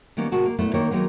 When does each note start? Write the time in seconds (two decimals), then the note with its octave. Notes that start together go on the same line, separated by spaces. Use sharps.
0.17 D#3 G3 A#3 B3 C#4
0.32 A2 C3 G#3 F#4 A#4 A5
0.46 A#3
0.59 A#2 A3 B3 E4
0.74 D#3 A#3 A#4 C#5
0.90 D#3 F#3 G#3 A#3 B3